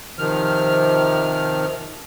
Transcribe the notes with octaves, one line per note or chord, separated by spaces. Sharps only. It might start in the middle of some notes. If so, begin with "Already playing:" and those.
C3 D#3 F3 F6